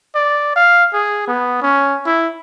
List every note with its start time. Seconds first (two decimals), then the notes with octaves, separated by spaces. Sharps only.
0.15 D5
0.56 F5
0.93 G#4
1.28 B3
1.62 C#4
2.06 E4